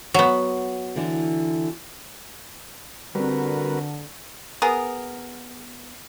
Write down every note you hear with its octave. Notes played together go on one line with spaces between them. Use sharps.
F#3 B3
D3 E3
D3 G3 C4 F#4 A#4 B4
B3 G#4 A#4